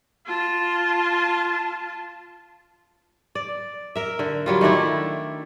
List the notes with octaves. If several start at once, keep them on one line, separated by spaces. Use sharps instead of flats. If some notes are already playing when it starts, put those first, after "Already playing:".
F4 A5
D5
A#4 E5
D3
F#3 G3 F4
D#3 A3 D4 E4